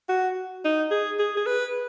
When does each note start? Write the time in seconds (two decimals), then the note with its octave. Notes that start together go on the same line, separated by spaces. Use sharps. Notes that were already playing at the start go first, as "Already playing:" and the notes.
0.09 F#4
0.64 D#4
0.91 G#4
1.19 G#4
1.37 G#4
1.46 B4